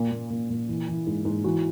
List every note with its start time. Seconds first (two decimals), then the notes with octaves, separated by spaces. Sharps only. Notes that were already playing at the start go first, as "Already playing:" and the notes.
Already playing: A#2
0.12 A#2
0.30 A#2
0.50 A#2
0.68 E3
0.88 E3
1.06 G#2
1.25 G#2
1.44 E3 F#4